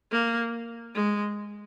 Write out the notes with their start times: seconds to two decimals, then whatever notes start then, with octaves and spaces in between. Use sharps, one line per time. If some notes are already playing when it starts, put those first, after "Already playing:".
0.12 A#3
0.95 G#3